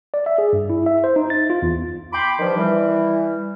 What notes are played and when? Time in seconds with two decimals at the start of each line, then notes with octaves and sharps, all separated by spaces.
0.14 D5
0.26 E5
0.38 G#4
0.53 G2
0.70 E4
0.86 E5
1.04 C5
1.16 D#4
1.30 A6
1.50 F4
1.62 E2
2.13 G5 B5 C6 D6
2.40 G2 D#3 F3
2.57 E3 G3